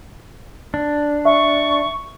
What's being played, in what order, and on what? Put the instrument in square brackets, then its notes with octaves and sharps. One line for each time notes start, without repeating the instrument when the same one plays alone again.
[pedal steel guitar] D4
[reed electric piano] E5 [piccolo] C#6